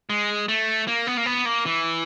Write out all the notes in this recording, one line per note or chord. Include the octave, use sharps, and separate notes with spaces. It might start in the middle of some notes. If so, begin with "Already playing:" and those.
G#3
A3
A#3
B3
A#3
B3
A#3
E3